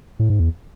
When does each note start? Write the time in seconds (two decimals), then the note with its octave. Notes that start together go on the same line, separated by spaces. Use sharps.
0.19 A2
0.30 G#2
0.40 E2